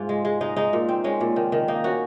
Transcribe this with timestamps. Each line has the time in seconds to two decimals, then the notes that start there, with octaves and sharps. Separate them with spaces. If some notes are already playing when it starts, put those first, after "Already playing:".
Already playing: G#2 F4
0.09 G#3
0.25 G#3
0.41 G#3 D#4
0.56 G#3 D#4
0.73 A#2
0.89 C4
1.04 G#3 C#4
1.20 A#2
1.36 D#3
1.52 D#3
1.68 A#3 D#4
1.84 C#4 F#4